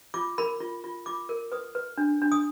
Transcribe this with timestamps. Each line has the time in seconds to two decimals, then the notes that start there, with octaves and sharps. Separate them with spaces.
0.14 F4 D6
0.38 A#4 B5
0.60 F4
0.84 F4
1.06 F4 D6
1.29 A#4
1.52 B4 D#6
1.75 B4
1.98 D4
2.22 D4
2.32 D#6